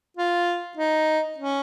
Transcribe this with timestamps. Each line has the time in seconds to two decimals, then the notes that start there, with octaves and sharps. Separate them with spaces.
0.17 F4
0.78 D#4
1.38 C#4